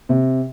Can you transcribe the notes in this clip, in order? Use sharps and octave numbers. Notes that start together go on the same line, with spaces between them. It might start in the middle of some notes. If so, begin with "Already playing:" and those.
C3